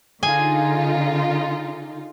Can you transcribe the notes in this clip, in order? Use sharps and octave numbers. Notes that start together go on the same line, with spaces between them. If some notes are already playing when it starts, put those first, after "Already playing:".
D3 D#4 F4 G#4 G#5